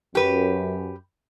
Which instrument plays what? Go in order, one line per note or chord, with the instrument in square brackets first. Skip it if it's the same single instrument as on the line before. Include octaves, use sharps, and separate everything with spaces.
[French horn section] F#2 [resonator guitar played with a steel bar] G4 B4